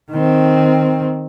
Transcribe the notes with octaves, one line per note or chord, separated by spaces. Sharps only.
D#3 C4